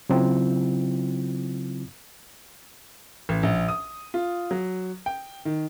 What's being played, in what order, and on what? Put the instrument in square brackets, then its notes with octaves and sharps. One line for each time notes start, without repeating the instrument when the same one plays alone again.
[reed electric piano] C#3 F#3 C4 E4 F4
[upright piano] A1
A#1
D#6
F4
F#3
G5
D#3